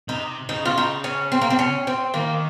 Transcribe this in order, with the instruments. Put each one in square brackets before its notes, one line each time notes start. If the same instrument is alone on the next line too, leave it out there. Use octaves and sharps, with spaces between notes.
[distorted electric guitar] C3 [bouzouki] D#4
[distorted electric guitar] C#3 [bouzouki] D#4
[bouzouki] F4
D#4
C#4
C4
A#3
C4
C#4
C4
[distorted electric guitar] D#3 [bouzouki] A#3